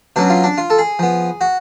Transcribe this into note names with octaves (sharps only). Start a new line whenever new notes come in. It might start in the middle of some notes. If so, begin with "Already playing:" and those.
B2 F#3 C#4 D4
F4
D4
F4
A4
G#4
F3 B3
F#4